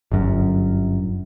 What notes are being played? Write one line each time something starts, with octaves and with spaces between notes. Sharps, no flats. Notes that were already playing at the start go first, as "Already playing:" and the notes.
G1 F#2